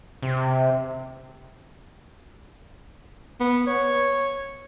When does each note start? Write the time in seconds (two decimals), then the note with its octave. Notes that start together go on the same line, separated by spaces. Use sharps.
0.22 C3
3.40 B3
3.67 C#5